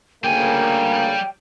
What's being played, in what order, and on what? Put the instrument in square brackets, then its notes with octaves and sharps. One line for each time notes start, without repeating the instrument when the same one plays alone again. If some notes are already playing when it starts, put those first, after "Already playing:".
[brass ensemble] D2 C#3 A#3 [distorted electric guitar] G3 G#5 [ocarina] G5